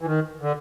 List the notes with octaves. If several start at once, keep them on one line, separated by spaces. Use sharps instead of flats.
E3
D#3
D3